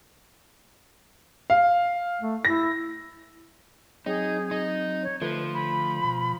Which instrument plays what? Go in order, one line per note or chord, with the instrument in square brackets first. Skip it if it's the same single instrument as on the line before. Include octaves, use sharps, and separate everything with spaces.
[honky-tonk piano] F5
[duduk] A3
[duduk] E4 [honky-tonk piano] A#6
[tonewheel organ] F#3 C4 [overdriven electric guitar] D#4 [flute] G#4
[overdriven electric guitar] D#4
[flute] C#5
[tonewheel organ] D3 A3 [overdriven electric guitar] F3 [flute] B4
[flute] B5
[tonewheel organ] B2